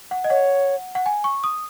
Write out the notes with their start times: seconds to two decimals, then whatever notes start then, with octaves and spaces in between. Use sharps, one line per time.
0.11 F#5
0.24 D#5
0.30 C#5 F#5
0.95 F#5
1.06 G#5
1.24 C#6
1.44 D#6